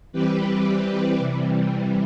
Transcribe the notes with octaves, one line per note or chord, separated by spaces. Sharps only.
E3 G3 C4 G4 B4
C3 E3 G3